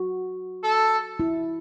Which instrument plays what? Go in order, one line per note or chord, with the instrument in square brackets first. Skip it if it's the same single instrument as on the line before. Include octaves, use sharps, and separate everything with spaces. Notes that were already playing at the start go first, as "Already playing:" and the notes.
Already playing: [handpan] F#4
[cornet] A4
[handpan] E4